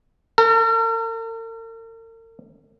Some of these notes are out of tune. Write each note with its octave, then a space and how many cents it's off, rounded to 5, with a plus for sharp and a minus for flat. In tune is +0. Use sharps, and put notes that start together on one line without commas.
A#4 -45